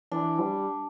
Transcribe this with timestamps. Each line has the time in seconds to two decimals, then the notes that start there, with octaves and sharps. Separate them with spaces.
0.11 E3 D4
0.40 G3